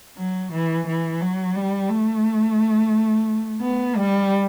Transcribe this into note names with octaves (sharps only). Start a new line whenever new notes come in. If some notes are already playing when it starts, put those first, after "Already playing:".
F#3
E3
E3
F#3
G3
A3
B3
G3